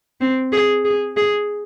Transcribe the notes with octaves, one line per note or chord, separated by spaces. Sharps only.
C4
G#4
G#4
G#4